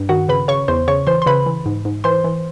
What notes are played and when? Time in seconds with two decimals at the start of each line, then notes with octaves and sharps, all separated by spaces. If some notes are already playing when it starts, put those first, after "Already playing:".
Already playing: G2
0.09 D#3 F#4 F#5
0.29 C#3 B4 B5
0.48 C#3 C#5 C#6
0.68 E2 C5 C6
0.88 C#3 C#5 C#6
1.07 E3 C5 C6
1.22 C6
1.26 C#3 B4 B5
1.46 E3
1.66 G#2
1.85 G#2
2.04 E3 C5 C6
2.24 E3